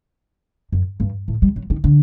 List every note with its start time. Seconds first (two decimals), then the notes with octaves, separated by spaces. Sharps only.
0.72 F#2
1.00 G2
1.28 A2
1.42 G3
1.56 F#3
1.70 D#3
1.84 D3